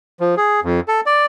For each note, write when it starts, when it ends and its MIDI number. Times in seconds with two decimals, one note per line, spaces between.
0.20 0.35 53
0.37 0.60 68
0.63 0.80 41
0.88 1.01 69
1.06 1.26 74